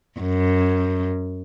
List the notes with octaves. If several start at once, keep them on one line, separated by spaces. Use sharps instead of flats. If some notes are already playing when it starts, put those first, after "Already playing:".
F#2